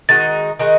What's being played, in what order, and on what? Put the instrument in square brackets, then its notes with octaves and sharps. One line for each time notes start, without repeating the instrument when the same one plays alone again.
[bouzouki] D#3 G#3 D#4 F#4 [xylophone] A6
[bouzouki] D#3 G#3 D#4 F#4